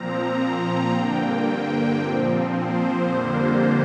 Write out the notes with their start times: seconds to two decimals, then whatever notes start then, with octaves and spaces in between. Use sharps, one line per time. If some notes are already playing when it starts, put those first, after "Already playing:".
Already playing: A#2 F3 C4 A#5
0.89 G2 D3 A#3 G5
1.96 A#2 F3 C4
2.50 C5
3.04 F2 D3 G3 A#3